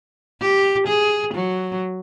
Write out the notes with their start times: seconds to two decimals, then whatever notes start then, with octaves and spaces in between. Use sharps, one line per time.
0.41 G4
0.87 G#4
1.34 F#3